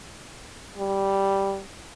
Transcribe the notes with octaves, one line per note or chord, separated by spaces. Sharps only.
G3